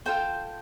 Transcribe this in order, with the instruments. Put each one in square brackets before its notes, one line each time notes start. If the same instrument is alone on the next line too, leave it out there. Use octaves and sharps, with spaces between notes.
[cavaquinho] F4 A4 C5 G5